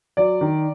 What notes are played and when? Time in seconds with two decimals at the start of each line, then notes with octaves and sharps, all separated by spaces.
0.17 F#3 D5
0.41 D#3